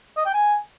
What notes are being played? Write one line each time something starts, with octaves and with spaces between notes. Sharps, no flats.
D#5
G5
G#5